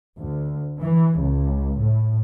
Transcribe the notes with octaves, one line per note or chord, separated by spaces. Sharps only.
D2
E3
C#2
A2